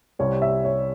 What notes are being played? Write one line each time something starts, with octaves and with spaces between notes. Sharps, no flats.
C2 C3 G3 C4 C#5
E5
C#5